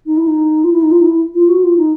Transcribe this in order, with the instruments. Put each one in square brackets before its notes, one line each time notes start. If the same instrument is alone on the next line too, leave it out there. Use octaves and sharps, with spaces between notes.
[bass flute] D#4
E4
D#4
F4
E4
D#4
F4
D#4
E4
F4
F#4
F4
D#4